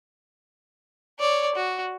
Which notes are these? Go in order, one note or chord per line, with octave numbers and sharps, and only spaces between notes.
C#5 D5
F#4